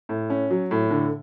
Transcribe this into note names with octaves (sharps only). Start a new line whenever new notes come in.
A2
C#4
F#3
A2
D3